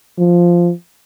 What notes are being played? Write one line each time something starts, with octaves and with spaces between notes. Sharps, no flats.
F3